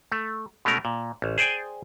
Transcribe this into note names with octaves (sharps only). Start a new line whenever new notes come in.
A3
B2 G#3 A3 C#4 A#4
A#2
A1
G#4 C5 D5 G5 G#5